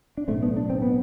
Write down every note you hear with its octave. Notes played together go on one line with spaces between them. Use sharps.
D4
B1 A2 A3 C4
B3 D4
D4
C4
B3